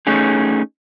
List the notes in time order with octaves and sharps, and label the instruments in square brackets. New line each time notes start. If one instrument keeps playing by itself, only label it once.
[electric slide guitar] A3 C#4 D#4 G#4